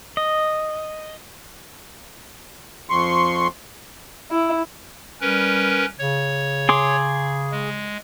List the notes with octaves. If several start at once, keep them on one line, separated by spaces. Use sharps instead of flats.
D#5
F2 C6 C#6
E4
G3 C#4 A#4 B4
C#3 C#5
G#4 C6 D6
G#3